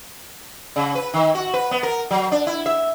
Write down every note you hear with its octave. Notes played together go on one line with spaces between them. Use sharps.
C#3
B4
D#3
F#4
B4
B3
A#4
F#3
D4
E4
E5